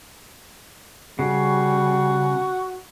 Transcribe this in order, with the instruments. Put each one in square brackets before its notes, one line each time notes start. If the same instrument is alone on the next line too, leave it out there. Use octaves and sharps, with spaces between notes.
[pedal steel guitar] C#3 [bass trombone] G3 [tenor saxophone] F#4